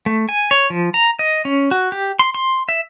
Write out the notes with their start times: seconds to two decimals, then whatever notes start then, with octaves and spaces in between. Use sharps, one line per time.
0.06 A3
0.29 G#5
0.51 C#5
0.70 F3
0.94 A#5
1.19 D#5
1.45 C#4
1.71 F#4
1.92 G4
2.19 C6
2.35 C6
2.69 E5